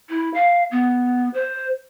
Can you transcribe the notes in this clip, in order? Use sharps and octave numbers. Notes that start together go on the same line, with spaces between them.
E4
F5
B3
C5